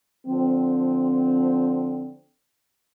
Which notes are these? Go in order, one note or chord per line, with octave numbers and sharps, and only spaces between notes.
D3 F3 C4